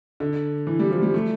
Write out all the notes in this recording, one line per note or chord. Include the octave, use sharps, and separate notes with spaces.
D3
E3
G3
F3
G3
A3